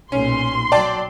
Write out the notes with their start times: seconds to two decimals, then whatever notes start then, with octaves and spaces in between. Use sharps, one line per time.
0.12 B1 A#2 C#4 C6
0.72 F#3 D5 G5 A5